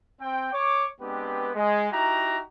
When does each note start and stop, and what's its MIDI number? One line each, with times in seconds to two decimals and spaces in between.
0.21 0.49 60
0.21 0.49 79
0.52 0.86 73
0.52 0.86 85
0.52 0.86 86
1.01 1.50 56
1.01 1.50 59
1.01 1.50 60
1.01 1.50 62
1.01 1.50 67
1.01 1.50 71
1.55 1.88 56
1.92 2.40 63
1.92 2.40 64
1.92 2.40 66
1.92 2.40 67
1.92 2.40 82